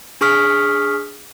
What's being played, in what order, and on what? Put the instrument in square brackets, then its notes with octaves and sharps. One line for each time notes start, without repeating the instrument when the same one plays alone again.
[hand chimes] D4 G#4 C#6 D#6 F6 B6